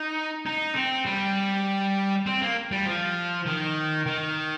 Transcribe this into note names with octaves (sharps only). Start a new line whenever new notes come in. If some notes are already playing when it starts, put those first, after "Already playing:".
Already playing: D#4
D#4
C4
G3
C4
A#3
G3
F3
D#3
D#3